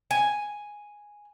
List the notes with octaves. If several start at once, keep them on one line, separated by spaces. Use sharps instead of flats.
G#5